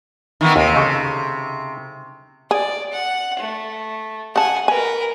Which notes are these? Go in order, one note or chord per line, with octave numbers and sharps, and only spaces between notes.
D#3 E3 B3
D#2 C3
C#3 A4
G#4 D5
F#5
A3
C#3 F#5 G#5 A5
A#4 B4 G#5